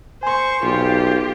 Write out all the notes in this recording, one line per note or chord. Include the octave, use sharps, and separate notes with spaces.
C5 G#5 C6 C#6
B1 F4 G4